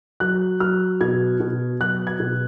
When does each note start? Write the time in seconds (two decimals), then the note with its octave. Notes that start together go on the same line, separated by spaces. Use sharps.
0.20 F#3 F#6
0.60 F#3 F6
1.01 B2 G#6
1.40 B2
1.81 F#3 F#6
2.07 G#6
2.20 B2